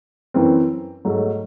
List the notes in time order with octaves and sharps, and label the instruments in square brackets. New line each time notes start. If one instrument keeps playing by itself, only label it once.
[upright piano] F#2 E3 C4
G#2 F#3 A3